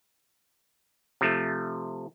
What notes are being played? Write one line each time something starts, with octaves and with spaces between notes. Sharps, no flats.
C3 F3 A3